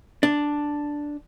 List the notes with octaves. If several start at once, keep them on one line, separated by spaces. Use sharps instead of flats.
D4